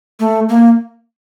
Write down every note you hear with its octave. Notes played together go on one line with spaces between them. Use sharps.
A3
A#3